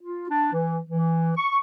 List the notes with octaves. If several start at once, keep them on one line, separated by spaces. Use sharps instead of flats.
F4
D4
E3
E3
C#6